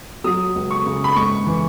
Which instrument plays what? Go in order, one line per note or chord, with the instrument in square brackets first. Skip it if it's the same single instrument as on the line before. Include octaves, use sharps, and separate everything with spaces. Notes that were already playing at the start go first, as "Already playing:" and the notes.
[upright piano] F#3 D#6
C#2
C#6
C#3
B5
G#2 C#6
E3